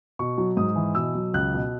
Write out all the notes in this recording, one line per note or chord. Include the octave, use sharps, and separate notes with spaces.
B2 C#6
F#3
G#2 D#6
E3
B2 E6
F#3
C#2 F#6
B2